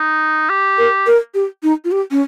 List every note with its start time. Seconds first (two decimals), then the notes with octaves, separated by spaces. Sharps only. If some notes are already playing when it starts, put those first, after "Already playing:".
Already playing: D#4
0.50 G4
0.78 A#4
1.06 A#4
1.34 G4
1.63 D#4
1.84 F4
1.92 G4
2.11 C#4